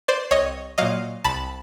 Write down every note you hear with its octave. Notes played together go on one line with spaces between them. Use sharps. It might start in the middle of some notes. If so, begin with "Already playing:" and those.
C5 D5
C2 C#5 D#5
A#2 F#3 D#5 F5
C2 A5 B5